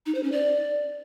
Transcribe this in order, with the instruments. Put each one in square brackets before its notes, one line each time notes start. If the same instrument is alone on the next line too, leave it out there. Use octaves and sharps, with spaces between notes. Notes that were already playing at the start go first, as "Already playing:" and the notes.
[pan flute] D#4
C5
C#4
D5